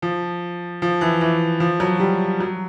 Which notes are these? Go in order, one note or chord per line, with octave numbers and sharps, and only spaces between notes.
F3
F3
E3
E3
F3
F#3
G3
F#3